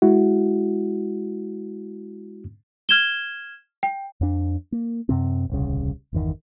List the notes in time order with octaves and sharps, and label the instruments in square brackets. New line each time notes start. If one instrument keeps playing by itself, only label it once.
[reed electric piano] G#3 E4 F#4
[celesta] F6 G#6 E7 G7
G5
[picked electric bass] F2 D4
A#3
F#2 C3 C4
D#1 C2 C#3
G1 E2 D#3